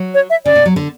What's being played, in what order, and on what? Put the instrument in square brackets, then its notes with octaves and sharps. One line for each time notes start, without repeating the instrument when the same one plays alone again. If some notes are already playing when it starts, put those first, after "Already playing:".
Already playing: [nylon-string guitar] F#3
[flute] C#5
E5
[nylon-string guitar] C#3 [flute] D5
[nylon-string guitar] B2
F#3
D3